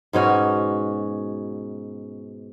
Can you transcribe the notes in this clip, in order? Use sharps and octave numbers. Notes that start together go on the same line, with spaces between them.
G#2 B2 C#4 F#4